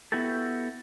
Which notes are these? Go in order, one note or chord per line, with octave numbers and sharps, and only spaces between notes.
B3 E4 F#4 G4 A4